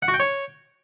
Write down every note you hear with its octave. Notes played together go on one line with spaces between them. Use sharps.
F#5
F#4
G5
C#5